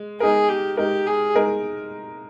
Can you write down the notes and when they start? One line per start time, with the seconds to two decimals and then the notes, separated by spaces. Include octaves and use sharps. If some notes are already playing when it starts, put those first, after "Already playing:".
Already playing: G#3
0.20 G#3 D#4 G#4 A#4
0.49 G4
0.77 G#3 D#4 G4 A#4
1.07 G#4
1.36 G#3 D#4 A#4